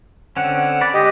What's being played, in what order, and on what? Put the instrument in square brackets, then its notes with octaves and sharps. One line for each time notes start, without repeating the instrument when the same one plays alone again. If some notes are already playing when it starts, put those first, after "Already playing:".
[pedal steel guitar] D3 C4 C#4 [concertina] F#5
[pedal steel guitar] B4 D5
[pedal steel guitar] G#3 [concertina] G4 D#5